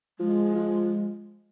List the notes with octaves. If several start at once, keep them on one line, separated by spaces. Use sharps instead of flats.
F3 G#3
F3